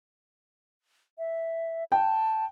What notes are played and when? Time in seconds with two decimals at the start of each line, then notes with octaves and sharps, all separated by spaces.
1.18 E5
1.92 G5 A5